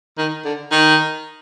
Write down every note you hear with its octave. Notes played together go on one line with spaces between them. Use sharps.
D#3
D3
D#3